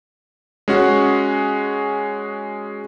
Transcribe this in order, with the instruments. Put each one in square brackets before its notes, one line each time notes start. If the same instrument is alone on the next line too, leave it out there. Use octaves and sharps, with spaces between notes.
[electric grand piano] G#3 C#4 F#4